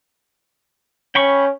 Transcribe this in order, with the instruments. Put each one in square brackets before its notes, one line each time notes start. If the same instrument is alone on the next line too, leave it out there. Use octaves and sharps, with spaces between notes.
[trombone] C#4 [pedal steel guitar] G5 B5 C#6